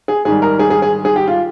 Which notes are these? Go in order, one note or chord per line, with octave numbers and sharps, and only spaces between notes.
G#4
G#2 D#3 G3 G#4
A#4
G#4
G#4
G#4
G#4
G4
F4